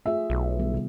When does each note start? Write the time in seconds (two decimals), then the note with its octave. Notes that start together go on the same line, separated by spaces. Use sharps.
0.06 A3 F4 G#4 E5
0.30 B1
0.59 D#3 G3 B3
0.74 C3